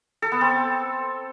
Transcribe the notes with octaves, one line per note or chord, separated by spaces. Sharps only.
A4
B3
C4